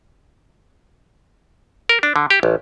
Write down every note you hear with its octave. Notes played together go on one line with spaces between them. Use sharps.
A#4
D4
D3
G4
A1